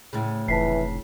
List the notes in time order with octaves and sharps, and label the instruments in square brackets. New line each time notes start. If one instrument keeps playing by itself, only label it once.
[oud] D2 A2 C#3
[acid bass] F1 [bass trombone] E3 [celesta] A5 B6 C7